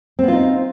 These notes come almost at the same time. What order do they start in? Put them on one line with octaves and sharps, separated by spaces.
C4 B3 F4 D#4